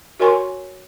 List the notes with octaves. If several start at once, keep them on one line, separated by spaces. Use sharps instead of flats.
F#4 A#4 C#5 G#5 C6 C#6